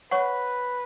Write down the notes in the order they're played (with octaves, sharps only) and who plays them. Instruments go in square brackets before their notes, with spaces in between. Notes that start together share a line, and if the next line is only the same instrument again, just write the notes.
[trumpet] B4 [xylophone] C#5 F#5 C#6